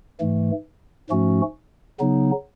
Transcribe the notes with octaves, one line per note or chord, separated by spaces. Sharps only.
G#2 E3 A3
G#2 F3 A3 C#4 F#4
C#3 F#3 B3 D#4